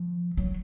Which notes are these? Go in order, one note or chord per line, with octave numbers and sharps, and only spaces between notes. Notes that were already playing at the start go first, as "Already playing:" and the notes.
Already playing: F3
F#3